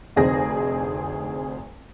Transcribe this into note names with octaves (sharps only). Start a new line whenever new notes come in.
F1 D2 C4 D#4 G#4 A#6